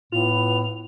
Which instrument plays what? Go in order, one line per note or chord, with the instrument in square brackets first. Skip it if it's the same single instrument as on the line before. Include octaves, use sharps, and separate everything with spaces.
[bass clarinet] A2 [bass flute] B3 [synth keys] F4 [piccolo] F7